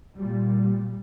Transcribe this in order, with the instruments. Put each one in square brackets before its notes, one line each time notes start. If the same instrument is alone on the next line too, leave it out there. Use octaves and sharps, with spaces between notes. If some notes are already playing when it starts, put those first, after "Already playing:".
[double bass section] A#2 G3